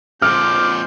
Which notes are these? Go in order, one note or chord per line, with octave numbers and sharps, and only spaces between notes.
F2 A#2 C5 D6 F6 G6